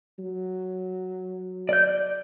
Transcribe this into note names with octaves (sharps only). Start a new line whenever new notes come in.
F#3
D5 G6